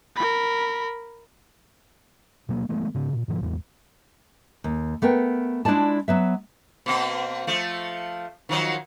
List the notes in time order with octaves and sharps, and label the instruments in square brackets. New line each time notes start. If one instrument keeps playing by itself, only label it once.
[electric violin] A#4 B5
[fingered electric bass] B2 F#3 A#3
E3 G#3 A3 B3
G#2 C#3
A#2
G#2 D#3 F3
A1 E2 G#3
[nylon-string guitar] D#2
A3 B3 A#4 G5
G#3 D4 E4 F4 D5 A5
F#3 B3 E5
[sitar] B2 A#3 C4
F3 A3
D#3 F3 F#3